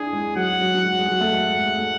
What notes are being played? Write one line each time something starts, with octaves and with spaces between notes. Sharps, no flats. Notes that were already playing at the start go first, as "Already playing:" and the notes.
Already playing: D4 E4 G#4
G#3
F#3 F#5
F#3
F#3
G#3
G#3
F#3
A3
G#3
G#3
A3